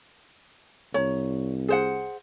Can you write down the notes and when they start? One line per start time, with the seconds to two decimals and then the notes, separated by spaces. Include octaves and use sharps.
0.94 C2 C#5 A#5
1.68 G#4 C5 F#5